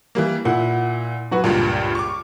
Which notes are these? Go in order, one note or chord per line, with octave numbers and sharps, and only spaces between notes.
E3 G3 A#3
A#2 E4 F#5
F#3 F#4 B4
C#2 G2 A#2 F4
C#6 D6